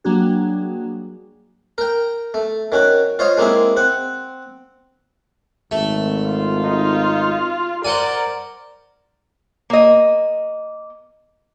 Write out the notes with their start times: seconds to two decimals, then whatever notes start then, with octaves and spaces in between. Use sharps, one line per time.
0.04 F#3 G3 A#3 D4 F#4 G#4
1.78 A#4 G5
2.34 A3
2.72 D#3 C#4 F#4
3.19 F4 C5 C#5 D#5 F5
3.37 G#3 A#3 C4 E4 G#4
3.76 C4 F#5
5.71 G#1 A3
6.29 F4
6.64 D#4
7.85 A#4 C5 D5 F#5 G#5
9.70 A#3 D#5